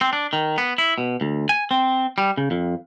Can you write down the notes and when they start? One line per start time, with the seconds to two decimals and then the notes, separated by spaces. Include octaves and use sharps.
0.01 C4
0.13 D4
0.33 D#3
0.58 B3
0.78 E4
0.98 B2
1.21 D2
1.49 G#5
1.71 C4
2.18 G3
2.37 C#3
2.51 F2